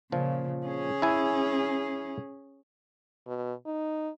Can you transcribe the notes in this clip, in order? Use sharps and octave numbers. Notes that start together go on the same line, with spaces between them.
A#2 C#3 F3
C#4 G#4
E4 G#5
B2
D#4